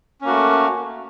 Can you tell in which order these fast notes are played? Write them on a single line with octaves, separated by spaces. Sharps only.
C#4 A#3 F#4 A3